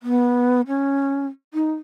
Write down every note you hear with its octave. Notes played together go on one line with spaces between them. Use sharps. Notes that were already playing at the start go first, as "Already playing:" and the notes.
B3
C#4
D#4